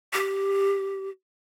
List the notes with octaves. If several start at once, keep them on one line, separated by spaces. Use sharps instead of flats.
G4